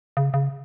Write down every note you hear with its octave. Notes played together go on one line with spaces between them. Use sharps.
C#3
C#3